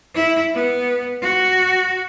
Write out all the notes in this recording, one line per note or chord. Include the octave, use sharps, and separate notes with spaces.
E4
B3
F#4